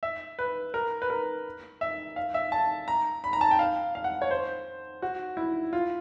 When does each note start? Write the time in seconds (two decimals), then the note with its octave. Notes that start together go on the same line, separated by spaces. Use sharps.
0.03 E5
0.39 B4
0.74 A#4
1.02 B4
1.10 A#4
1.81 E5
2.16 F5
2.34 E5
2.52 A5
2.88 A#5
3.24 B5
3.33 A#5
3.41 A5
3.51 G5
3.59 F5
3.95 F5
4.04 F#5
4.22 C#5
4.31 C5
5.02 F#4
5.37 E4
5.73 F4